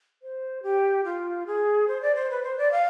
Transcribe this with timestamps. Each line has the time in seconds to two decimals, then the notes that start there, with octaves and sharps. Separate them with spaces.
0.22 C5
0.63 G4
1.04 F4
1.47 G#4
1.88 C5
2.02 D5
2.15 C5
2.30 B4
2.43 C5
2.58 D5
2.72 F5